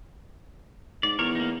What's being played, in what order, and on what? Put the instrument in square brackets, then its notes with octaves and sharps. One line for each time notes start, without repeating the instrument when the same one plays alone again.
[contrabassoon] G#2 [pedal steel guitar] D5
[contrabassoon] E2 [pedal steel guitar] A#4 C#5
[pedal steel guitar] A#3 D#4